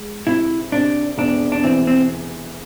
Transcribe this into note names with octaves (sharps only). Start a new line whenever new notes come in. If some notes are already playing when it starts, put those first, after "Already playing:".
Already playing: G#3
C3 E4
C3 D4
E1 D4
D4
E3 C4
C4